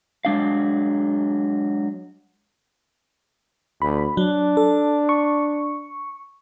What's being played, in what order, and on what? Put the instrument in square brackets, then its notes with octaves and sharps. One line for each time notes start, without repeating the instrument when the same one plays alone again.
[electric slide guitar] F#3 G#3 D4 F5
[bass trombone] D2 [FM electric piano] B5
[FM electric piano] F#3 [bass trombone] D4
[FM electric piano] A4
C#6